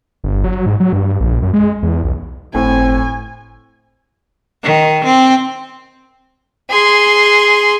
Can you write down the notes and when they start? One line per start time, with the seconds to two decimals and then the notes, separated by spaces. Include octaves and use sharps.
0.24 G1
0.44 F#3
0.66 G#2
0.80 F#3
0.93 G2
1.20 A#1
1.42 F#2
1.53 G#3
1.82 E2
2.04 B1
2.55 G1 A2 C4 G#5
4.63 D#3
5.05 C4
6.70 G#4 C6